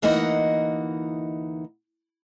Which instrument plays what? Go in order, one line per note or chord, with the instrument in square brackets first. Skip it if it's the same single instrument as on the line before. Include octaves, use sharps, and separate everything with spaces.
[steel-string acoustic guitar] D2 E3 A#3 D#4 D#5 F#5